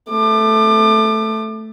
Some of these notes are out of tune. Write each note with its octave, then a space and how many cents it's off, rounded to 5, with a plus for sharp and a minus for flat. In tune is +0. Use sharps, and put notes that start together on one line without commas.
A3 +0 D6 +30